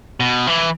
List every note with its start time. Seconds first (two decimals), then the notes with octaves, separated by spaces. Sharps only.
0.20 B2
0.47 E3